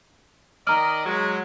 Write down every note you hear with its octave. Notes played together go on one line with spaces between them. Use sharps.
D#3 D5 D#5 A#5 F6
F#3 G#3